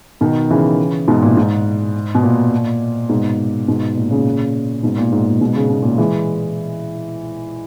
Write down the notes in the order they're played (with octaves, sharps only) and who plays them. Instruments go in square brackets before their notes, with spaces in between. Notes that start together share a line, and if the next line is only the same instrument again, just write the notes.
[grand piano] B2 D#3
C#3 E3
G#2 B2
A#2
G#2
B2
A#2
G#2 B2
G#2 B2
A#2
A#2 C#3
G#2 B2
A#2
G#2
A#2
G#2 B2
C#3
B2
A#2 C#3
E3 G#3